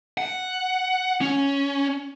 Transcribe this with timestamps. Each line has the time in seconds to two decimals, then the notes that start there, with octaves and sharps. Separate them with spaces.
0.18 F#5
1.21 C#4